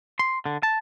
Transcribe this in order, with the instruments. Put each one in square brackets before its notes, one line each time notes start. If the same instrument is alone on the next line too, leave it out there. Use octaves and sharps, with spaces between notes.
[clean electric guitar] C6
D3
A5